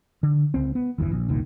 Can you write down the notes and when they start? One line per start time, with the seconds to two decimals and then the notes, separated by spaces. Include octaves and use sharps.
0.23 D3
0.54 C#2 C4
0.75 B3
0.98 G1 E2 D3 E3
1.12 A#1
1.29 F1 C2 A#2 D#3